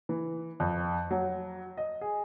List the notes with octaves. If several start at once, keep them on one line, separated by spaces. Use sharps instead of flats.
E3
F2
F#3
D#5
G#4